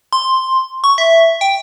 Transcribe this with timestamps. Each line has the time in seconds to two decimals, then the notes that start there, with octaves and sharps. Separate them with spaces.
0.13 C6
0.84 C#6
0.98 E5
1.41 G5